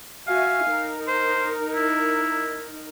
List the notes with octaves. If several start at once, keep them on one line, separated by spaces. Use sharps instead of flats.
F#4 E5 F5 G#5
D#4 A#4
C5
E4